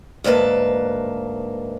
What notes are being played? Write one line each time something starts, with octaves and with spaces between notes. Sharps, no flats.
D2 G#2 A#3 B4 A5